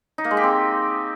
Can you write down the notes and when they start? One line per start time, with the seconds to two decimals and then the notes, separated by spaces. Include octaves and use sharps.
0.18 D#4
0.24 A#3
0.31 G#3
0.37 G4
0.43 C4